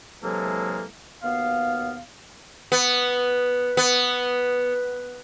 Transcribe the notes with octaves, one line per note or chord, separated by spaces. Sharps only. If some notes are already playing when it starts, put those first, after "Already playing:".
C3 E3 F#3 G#3 A#3 A4
D#2 B2 B3 F5
B3
B3